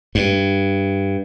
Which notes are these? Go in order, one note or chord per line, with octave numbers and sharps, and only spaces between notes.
G2